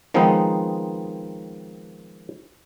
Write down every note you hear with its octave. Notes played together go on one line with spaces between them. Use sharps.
D#3 F3 G#3 B3 C4 D#4